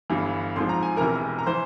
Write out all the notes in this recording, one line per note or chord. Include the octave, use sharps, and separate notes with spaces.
G1 G2 E3
G#1 G#2 F3 C6
A#5
G#5
E1 E2 C3 E3 A#4 A#5
A#5
E3 C5 C6